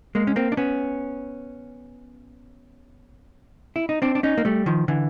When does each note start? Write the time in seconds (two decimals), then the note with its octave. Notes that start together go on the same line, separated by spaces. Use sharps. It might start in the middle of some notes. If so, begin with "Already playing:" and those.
0.15 G#3 A#3
0.27 C#4
0.36 A#3 C4
0.52 D4
0.57 B3 C#4
3.76 E4
3.89 D#4
4.02 C4 D4
4.15 D4
4.23 C#4 D#4
4.38 A#3
4.45 G3 A3
4.66 D#3 F3
4.88 D3 E3